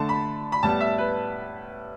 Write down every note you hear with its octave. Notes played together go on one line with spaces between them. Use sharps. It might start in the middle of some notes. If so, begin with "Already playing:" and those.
Already playing: D3 A3 A5
B5
B5
A2 G3 B3 A5
E5
B4